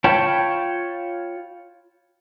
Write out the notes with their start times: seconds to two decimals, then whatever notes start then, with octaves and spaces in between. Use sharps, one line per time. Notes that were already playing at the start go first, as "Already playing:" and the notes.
0.04 F4 C#5 G5 A5 B5